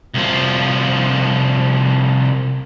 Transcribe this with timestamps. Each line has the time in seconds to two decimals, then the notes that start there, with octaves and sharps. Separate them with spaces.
0.14 C2 F3